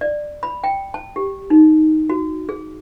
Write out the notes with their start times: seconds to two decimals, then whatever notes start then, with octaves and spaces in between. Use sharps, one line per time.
0.01 D5
0.43 B5
0.64 G5
0.94 A5
1.16 G4
1.50 D#4
2.10 F#4
2.49 G#4